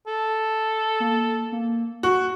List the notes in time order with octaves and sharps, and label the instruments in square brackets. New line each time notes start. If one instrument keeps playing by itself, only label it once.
[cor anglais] A4
[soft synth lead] A#3
A#3
[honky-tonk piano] F#4 [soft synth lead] C#6